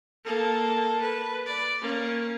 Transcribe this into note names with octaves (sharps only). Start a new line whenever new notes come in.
A#3 A4
B4
D5
A#3 C#4